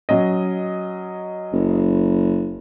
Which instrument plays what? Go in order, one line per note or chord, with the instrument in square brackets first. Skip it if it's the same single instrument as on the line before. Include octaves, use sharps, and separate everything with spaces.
[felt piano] F#3 C#4 D#5
[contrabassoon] F#1